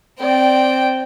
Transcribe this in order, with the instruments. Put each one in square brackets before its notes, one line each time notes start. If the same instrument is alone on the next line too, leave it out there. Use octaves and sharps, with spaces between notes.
[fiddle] C4 G5 [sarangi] D5